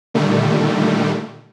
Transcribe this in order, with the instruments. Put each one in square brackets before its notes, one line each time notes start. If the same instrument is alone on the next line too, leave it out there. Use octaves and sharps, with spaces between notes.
[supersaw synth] A#2 D3 D#3 G3 A3